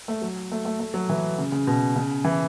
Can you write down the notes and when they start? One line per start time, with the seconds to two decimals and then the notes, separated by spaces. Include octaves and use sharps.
0.08 A3
0.22 F#3
0.52 A3
0.65 A3
0.80 A3
0.94 F#3
1.09 E3
1.38 C#3
1.52 C#3
1.67 B2
1.96 C#3
2.25 E3